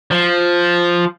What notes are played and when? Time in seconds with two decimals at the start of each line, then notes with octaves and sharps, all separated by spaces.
0.11 F3